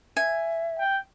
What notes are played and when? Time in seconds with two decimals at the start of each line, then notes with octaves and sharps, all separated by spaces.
0.17 E5 G#5
0.79 G5